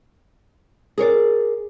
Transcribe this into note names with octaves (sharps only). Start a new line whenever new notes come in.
G#4 A#4 C#5 D5